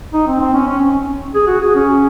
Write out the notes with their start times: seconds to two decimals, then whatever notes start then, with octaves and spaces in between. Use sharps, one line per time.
0.14 D#4
0.27 C4
0.41 C4
0.54 C#4
0.68 C#4
1.35 G#4
1.47 F#4
1.61 G#4
1.75 C#4